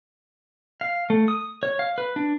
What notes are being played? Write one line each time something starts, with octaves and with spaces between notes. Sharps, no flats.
F5
A3
D#6
C#5
F5
B4
D4